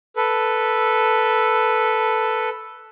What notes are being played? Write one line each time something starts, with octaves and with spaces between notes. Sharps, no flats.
A4 B4